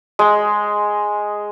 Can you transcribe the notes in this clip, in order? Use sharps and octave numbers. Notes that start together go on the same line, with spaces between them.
G#3